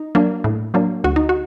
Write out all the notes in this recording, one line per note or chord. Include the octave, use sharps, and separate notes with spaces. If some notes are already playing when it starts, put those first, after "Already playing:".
Already playing: D#4
F#3 A#3 D4
A2
F#3 A#3 D4
D2 F#4
D#4
F#4